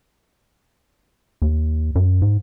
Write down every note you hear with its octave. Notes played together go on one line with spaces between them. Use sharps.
D#2
F#2
G#2